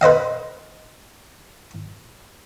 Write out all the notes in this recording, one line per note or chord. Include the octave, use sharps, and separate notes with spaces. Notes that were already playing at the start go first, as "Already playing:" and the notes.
B4 C5 D#5 F5